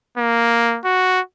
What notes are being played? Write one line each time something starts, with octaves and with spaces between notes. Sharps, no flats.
A#3
F#4